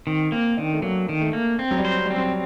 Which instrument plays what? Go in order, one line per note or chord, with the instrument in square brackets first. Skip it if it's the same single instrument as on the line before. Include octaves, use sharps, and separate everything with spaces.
[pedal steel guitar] D#3 [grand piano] C4
[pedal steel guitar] A#3 [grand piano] C4
[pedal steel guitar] D#3 [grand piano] D4
[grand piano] A3
[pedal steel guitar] F#3 [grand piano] A#3
[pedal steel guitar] D#3
[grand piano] A3
[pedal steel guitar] A#3
C4
[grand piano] F#3
G3
[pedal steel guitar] C5
[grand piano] G3 [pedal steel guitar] C4
[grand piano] F#3